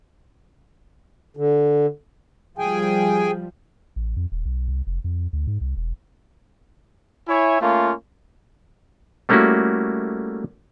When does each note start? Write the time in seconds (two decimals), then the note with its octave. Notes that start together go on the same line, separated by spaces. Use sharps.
1.37 D3
2.58 F3 G3 G#4 G5 G#5
3.96 A1
4.17 F2
4.32 D#1
4.45 B1
4.68 C2
4.87 F1
5.04 F2
5.33 D2
5.47 G#2
5.61 C2
5.77 E1
7.28 E4 C#5 E5 G#5
7.61 A3 A#3 C#4 F4
9.29 G3 A3 A#3 C#4 E4 F#4